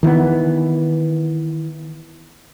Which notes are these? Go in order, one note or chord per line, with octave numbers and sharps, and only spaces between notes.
D#3 E3 A#3 B3